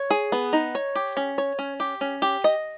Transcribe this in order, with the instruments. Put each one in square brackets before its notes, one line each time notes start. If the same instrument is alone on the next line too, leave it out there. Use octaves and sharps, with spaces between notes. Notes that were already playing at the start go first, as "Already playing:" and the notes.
Already playing: [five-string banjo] C#5
G#4
B3
D#4
C#5
G4
C#4
C#5
C#4
G4
C#4
G4
D#5